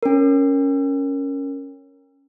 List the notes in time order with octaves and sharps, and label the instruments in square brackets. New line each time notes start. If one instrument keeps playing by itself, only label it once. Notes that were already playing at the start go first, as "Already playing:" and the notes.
[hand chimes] C#4 A#4